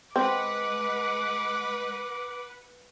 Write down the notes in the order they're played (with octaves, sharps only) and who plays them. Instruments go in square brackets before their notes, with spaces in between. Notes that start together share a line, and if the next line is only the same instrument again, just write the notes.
[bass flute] G#3 [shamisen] C4 [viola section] B4 F#5 [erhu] D6